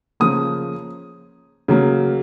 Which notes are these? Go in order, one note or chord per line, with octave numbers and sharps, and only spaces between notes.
C#3 F3 A#3 D#6
C#3 F#3 A#3